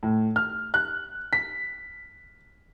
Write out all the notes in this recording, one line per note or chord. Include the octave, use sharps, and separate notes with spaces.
A2
F6
F#6
B6